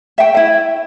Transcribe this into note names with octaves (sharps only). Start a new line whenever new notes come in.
E5 G5
E4 E5